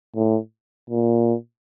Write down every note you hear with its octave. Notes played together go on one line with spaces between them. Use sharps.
A2
A#2